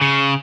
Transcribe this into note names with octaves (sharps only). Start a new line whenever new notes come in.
C#3